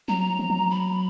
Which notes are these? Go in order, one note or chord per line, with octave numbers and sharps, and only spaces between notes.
F#3 A#5
F3
F3
F#3
B5